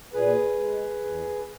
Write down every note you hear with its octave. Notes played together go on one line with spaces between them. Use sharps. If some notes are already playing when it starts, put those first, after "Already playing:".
A#2 G#4 B4
G#3
E2